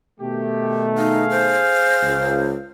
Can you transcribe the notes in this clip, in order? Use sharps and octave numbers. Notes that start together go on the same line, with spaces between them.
B2 D#3 A3 G4
D#4 G#4 F5
C5
C#2